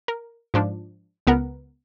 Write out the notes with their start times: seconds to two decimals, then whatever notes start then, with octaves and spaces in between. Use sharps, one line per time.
0.08 A#4
0.54 G#2 F3 D4
1.27 C#2 B3 A#4 F#5